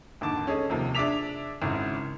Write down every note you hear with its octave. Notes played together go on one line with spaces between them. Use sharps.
G#1 D#2 D3 A5 D6
C#4 G#4 A4 D#5
D#2 C3 F3 A#3
D4 G#4 E5 D6 B6 F7
G#1 C#3 E4